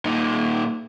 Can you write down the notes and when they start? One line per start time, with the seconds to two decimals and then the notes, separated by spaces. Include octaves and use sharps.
0.05 A#2 D#4